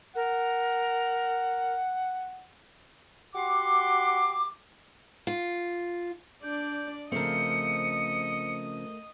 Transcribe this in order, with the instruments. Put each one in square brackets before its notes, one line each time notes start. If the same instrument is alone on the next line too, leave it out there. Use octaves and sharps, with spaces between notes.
[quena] A#4 [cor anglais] F#5
[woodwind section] F#4 G4 F#5 C6 D6
[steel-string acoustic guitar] F4
[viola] D4 D5 [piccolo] G6
[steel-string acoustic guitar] C#3 F3 C4 [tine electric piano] A3 A#4 [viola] D#5 [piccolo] C#7